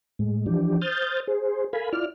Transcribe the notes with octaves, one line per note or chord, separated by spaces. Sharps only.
A2 G#3
E3 F3 D4 G4
C5 D#6 F6 G6 A6
G#4 C5
A4 A#4 F5 G#5 B5
E4 F4 D5 F6